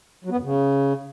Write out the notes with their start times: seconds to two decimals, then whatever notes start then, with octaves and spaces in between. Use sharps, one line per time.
0.25 F#3
0.31 B3
0.37 F#2
0.43 C#3